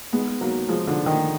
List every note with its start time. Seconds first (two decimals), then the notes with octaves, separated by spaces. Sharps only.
0.13 G#3 B3
0.41 F#3 A#3
0.69 F3 G#3
0.87 D3 F3
1.06 D#3